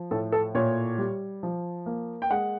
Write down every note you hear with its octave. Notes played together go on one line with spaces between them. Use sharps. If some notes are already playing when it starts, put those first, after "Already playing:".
Already playing: F3
A2 A4
A4
A#2 C#5
G3
F3
A#3
G5
G#3 F#5